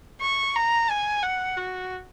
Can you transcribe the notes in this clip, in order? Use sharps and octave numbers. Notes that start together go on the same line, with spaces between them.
C#6
A#5
G#5
F#5
F#4